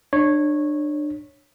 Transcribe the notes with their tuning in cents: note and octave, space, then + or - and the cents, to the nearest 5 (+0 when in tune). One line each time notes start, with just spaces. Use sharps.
D4 +25 C#5 -10